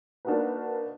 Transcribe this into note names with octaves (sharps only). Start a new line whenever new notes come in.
A#3 D4 D#4 F#4 A#4 B4